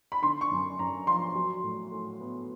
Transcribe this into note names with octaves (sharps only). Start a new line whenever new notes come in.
B5
D3 C6
C#6
F#2
F#2 A#5
F3 C6
F#3
A2
A2
B3